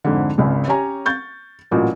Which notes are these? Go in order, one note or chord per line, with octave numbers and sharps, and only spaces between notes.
F2 G#2 D3
G#1 C#2 C#3
C#4 G4 C#5 G#5 A#5
C#6 G6 A6
A1 A#2 F#3